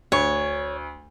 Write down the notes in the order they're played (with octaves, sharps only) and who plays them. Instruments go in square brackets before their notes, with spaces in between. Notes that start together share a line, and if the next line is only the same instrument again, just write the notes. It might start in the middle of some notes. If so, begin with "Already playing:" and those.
[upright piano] D2 [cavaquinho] C#5